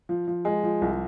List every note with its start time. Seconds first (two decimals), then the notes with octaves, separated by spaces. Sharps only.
0.09 F3
0.27 F3
0.45 G#3
0.63 F3
0.82 C2